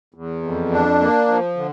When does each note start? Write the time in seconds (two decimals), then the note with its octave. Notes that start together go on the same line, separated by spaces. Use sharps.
0.14 E2
0.43 F2
0.72 D4
1.01 A#3
1.28 F3
1.57 D3